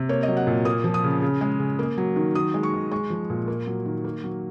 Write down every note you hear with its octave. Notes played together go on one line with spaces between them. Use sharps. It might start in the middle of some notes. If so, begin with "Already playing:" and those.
Already playing: C3
A#3 C#5
D#5
F#3
F#5
A#2
A#3 D#6
F3
D#6
C#3
C#3
G#3
C#3
A#3
F#3
D#3
D#3 D#6
G#3
C#6
D#3
G#3 C#6
F3
A#2
A#3
F#3
D#3
A#3
F#3